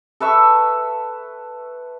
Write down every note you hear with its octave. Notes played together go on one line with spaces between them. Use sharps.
A4 B4 E5 C#6